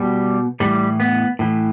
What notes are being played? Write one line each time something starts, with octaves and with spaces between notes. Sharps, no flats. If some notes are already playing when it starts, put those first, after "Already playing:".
Already playing: B2 G3
A2 E3 G3
B3
A2 E3